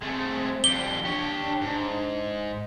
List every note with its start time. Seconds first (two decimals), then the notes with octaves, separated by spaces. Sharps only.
0.02 G#3 A3 C4
0.64 F2 G3 G7
1.05 D4 G4 C#5
1.61 G#2